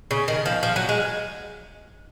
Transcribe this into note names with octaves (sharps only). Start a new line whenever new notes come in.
C#3
D#3
F3
F3
F#3
G#3